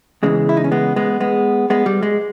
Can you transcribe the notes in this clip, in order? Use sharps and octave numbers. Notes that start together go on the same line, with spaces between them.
E2 C#3 E3 G#3
E4
D#4
C#4
G#3 B3
G#3 B3
G#3 B3
G#3 B3
G3
G#3